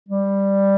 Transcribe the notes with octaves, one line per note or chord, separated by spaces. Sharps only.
G3